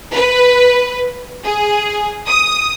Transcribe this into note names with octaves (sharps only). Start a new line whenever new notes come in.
B4
G#4
D#6